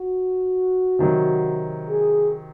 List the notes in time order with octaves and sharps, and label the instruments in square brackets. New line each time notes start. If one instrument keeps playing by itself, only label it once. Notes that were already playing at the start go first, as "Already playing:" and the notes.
Already playing: [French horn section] F#4
[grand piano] C3 D#3 F#3
[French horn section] G#4